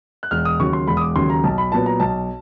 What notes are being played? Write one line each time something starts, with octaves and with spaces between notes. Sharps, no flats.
F#6
E1 F6
D#6
D#2 C#3 F#3 C#6
C6
E1 B5
D#6
D6
D#2 C#3 F#3 C6
A#5
B1 A5
B5
A#2 F#3 B3 A5
A#5
B1 A5